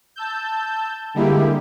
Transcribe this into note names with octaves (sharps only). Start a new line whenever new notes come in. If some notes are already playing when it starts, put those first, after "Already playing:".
A5 E6 G6
D3 G3 G#3 A#3 E4 G4